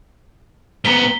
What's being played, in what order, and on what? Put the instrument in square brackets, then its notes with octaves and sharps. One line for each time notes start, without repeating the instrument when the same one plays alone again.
[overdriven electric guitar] G#2 B3 [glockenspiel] A#5 B6 G7